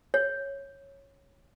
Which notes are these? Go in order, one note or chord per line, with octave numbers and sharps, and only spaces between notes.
C#5